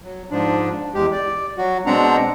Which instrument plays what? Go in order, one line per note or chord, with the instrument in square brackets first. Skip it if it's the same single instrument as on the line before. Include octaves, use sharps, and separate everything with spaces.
[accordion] F#3
G#2 F3 D4
E2 G#3 G4
D5
F#3 F#4
B2 G#3 C4 D4 F#5 A#5